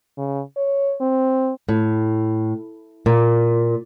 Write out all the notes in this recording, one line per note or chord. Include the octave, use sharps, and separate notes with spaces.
C#3
C#5
C4
A2
A#2